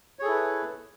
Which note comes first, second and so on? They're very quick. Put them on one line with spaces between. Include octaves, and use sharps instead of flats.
C#5 G#4 A4 E4 B4